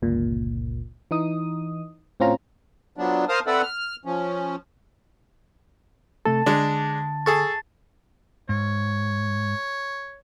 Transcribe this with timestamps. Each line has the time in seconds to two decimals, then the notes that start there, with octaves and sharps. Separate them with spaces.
0.02 G1 C#2 A#2
1.11 E3 D#4 D#6
2.20 A2 C4 C#4 F4 A#5
2.97 F3 F#3 B3 D4
3.29 A#4 C5 F5 A5 D#6 F6
3.47 C4 A4 B4 D5 E5 F#5
3.62 F6
4.05 F3 C#4
6.25 C3 A3 A4 A5 A6
6.46 D3 G#3 D4
7.26 G#4 A4 C#6 A6
8.49 G#2 C#5